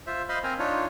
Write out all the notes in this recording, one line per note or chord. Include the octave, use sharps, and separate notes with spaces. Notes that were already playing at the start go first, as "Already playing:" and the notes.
F4 C5 E5
C5 D#5 F5 B5 C6
C4 A#4 C5 G#5 A#5
D4 D#4 F4 C#5